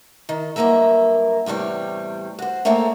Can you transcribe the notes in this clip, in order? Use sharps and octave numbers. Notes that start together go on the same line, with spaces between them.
D#3
G2 F#3 A#3 A#4 E5
E2 A2 C3 G3 C#5
F#4 C5
A3 A#3 C4 A4 C#5 D5